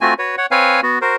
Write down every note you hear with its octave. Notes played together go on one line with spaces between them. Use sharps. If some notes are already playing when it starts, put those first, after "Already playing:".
A3 C4 F4 F#4 G#5
F#4 B4 C#5
C#5 F#5
C4 B4 C#5 F5 G#5
B3 F#4
F#4 A#4 C5